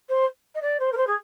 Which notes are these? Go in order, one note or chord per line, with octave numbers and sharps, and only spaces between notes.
C5
D#5
D5
C5
A#4
C5
G#4